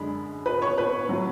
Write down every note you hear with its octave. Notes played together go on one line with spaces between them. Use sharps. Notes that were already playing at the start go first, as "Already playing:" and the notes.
Already playing: F#2 D3 G#3 B5
B4 B5
C#5 C#6
B4 B5
A2 F#3